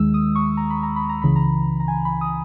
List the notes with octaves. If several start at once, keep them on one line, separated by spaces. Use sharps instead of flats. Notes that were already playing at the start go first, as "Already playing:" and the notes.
Already playing: D#2 D#3 G#3 E6
D#6
C#6
A#5
B5
A#5
B5
A#5
C#2 C#3 E3 B5
A#5
A#5
G#5
B5
D#6